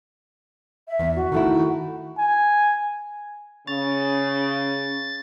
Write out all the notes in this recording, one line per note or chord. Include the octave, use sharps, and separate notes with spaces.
E5
E2
F#4
D#3 A3 E4
G#5
C#3 C#4 A6